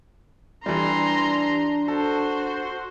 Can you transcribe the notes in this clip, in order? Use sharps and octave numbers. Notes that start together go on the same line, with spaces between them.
E3 G3 D4 A#5 C6
F#4 A4 C5